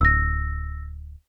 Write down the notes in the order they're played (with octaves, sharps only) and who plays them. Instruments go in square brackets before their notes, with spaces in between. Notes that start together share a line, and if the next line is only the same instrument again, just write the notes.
[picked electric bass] D1 [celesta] E6 A#6